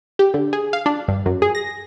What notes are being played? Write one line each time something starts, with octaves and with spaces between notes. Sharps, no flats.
G4
D3
G#4
F5
D4
G2
F#2
G#4
A#6